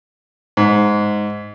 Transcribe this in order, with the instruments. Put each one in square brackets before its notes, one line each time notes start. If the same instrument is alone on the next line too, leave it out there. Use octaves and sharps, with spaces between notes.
[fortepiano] G#2